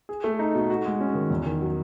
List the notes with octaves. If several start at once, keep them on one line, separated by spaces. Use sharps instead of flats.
G#4
A3
D#4
B2
F#4
G#3
C#4
D#3
E2
D#3
F#3